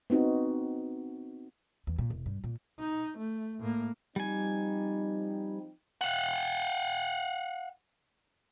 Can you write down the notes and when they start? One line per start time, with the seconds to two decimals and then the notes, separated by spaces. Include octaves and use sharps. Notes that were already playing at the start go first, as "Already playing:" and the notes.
0.10 B3 C4 D#4 F#4
1.87 E2
1.98 A#2
2.10 E1
2.26 G2
2.44 A#2
2.79 D#4
3.18 A3
3.60 A2 A#3
4.16 F3 G3 C4 D#4 G#5
6.01 F5 F#5